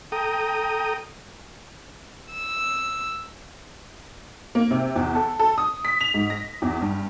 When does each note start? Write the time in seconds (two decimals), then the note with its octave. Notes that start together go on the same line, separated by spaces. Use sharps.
0.12 A4 G5 A#5 D#6
2.33 E6
4.55 A#3
4.71 C3
4.96 E2
5.15 A4
5.40 A4
5.58 D#6
5.85 B6
6.01 F7
6.14 G#2
6.30 A#6
6.62 E2
6.81 G2